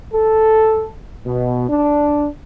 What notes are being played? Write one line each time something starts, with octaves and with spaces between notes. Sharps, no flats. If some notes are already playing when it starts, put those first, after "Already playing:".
A4
B2
D4